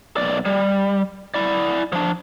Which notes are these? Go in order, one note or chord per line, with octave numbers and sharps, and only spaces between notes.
B1 D5
G3
E4 D5
F3 D4